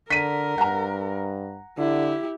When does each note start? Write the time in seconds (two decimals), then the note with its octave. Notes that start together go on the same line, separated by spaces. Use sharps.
0.10 D3 A#4 B6 D#7
0.58 G2 F#5 A#5
1.78 D3 E4 G4